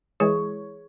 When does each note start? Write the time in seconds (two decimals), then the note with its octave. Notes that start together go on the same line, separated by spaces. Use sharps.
0.20 E3 G#3 G#4 C#5